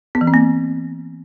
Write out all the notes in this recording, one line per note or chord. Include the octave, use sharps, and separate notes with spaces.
B3
E3
C4
A#3